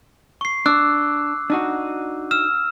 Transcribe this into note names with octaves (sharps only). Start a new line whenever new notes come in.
C#6 C7
D4 D6 E6 F#6
D4 D#4 F#4
E6 F6 E7